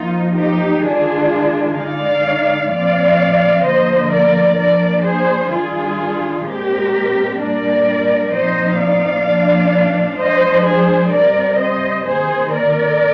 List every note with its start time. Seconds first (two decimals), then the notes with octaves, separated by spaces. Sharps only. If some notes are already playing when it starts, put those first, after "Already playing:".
Already playing: F3 A#3 D#4 F4
0.34 D#4 G4
0.82 D#3 G#3 D4 F4 G#4
1.75 D3 G#3 D#4 D5 F5
2.68 A#2 F3 C4 D5 F5
3.62 D3 F3 A#3 C5 D#5
4.09 A#4 D5
4.56 F3 A#3 D4 A#4 D5
5.03 G#4 C5
5.50 D#3 G3 D4 F4 G#4
6.43 A#2 G#3 C4 G4 A#4
7.37 A#2 G3 A#3 D4 A#4 D5
8.31 A#2 F3 C4 D#4 C5 D#5
8.78 D5 F5
9.25 A#2 F3 A#3 D4
10.18 F3 G#3 D4 C5 D#5
10.66 G#4 C5
11.12 C3 G3 C4 A#4 D5
11.59 C5 D#5
12.06 C3 D#3 A#3 G#4 C5
12.52 A#4 D5